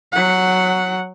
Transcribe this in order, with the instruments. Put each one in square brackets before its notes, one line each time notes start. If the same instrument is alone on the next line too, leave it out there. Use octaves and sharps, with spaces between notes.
[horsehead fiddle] F#3 F#5